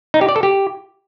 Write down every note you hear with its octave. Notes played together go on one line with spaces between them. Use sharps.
D#4
G4
D5
A4
G4